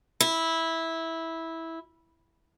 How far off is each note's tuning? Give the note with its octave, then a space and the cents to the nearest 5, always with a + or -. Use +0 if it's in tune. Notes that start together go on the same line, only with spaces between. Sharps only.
E4 -10